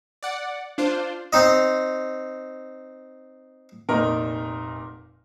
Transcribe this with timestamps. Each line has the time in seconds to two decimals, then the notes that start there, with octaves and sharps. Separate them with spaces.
0.23 D5 F#5
0.78 D4 F4 C5
1.33 C4 D#4 D#5
3.89 F1 A#2 D#4 A#4